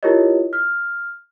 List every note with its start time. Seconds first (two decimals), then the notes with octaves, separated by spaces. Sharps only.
0.03 E4 F4 G4 A#4 C#5 D#5
0.53 F6